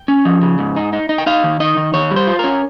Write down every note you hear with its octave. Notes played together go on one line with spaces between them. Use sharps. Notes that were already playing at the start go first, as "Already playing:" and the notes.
Already playing: G5
C#4
F3
C#3
G#2
D#4
D#4
D#4
G5
D#4 F5
D#3
D#4 D#5
D#3
D#3 C#5
G3
C5
F4
C#4 A#4